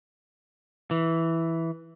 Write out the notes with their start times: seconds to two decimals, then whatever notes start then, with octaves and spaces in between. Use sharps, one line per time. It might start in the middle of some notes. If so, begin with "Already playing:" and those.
0.91 E3